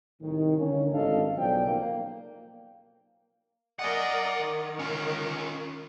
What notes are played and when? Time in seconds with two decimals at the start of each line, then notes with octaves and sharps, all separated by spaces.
0.21 C2 A2 D#3
0.57 D3 A#3 C#4
0.91 G#1 G2 A4 D#5 F5
1.36 B1 C#3 F3 D5 G5
1.65 A#3
3.79 A#4 D5 D#5 F#5 G#5
4.41 D#3
4.79 C#4 F4